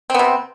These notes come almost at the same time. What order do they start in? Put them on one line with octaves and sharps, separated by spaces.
C4 B3 C3